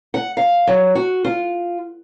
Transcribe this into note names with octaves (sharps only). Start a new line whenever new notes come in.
F#5
F5
F#3
F#4
F4